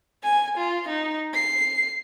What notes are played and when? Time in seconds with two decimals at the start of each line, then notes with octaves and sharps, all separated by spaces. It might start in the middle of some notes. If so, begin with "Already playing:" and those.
0.23 G#5
0.57 F4
0.88 D#4
1.34 C7